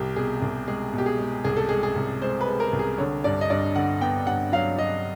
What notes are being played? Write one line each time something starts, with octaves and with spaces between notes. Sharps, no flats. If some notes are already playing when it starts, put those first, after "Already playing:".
Already playing: C2 G4
B2 G#4
C2
G#3 G#4
B2 G4
G#4
G#3
C2 G#4
A4
G#3 G#4
G#4
C2
G#3 C5
B4
G#3
A#4
C2
G#4
D3 C#5
G2 D5
D#5
G2 D5
D3 F#5
B3 G5
G2 F#5
F#3 F5
F#3 D#5